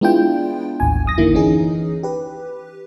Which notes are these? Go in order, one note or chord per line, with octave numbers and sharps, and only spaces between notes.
G#3 B3 D4 E4 F4 G5
A1 D#2 G#5
G1 F#2 D#6 A#6
D3 D#3 A#3 E4
E3 C#4 D#4 G#4
G4 B4